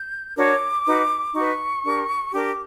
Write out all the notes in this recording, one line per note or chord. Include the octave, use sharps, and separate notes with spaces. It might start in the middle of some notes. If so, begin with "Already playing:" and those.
Already playing: G6
D4 F#4 A#4 C#5 D6
D#4 F#4 B4
D#4 F#4 B4 C#6
D4 G4 A#4
D4 G4 A#4 D6